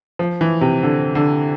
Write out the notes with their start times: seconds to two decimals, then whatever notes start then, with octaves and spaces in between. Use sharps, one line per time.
0.19 F3
0.41 E3
0.61 C3
0.83 D3
1.15 D3